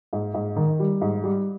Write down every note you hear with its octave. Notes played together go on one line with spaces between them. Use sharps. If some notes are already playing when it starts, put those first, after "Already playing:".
G#2
G#2
D#3
G3
G#2
G3